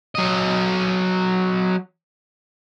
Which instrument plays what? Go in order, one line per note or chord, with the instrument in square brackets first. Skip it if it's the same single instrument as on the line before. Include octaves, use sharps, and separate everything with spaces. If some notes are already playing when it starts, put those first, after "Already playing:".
[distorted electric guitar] F#3 D#5